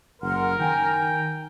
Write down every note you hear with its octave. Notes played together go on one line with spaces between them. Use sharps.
F#1 A#4 F#5 C6 F6
D#3 G5 G#5